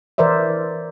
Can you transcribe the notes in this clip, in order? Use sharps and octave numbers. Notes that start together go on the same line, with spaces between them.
E3 A#4 C5 D5 E5